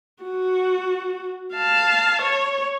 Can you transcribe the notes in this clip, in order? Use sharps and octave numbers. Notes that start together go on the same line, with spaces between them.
F#4
F5 A5
C#5